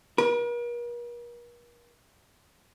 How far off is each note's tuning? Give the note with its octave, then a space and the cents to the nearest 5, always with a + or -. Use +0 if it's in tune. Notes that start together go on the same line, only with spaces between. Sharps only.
A#4 +45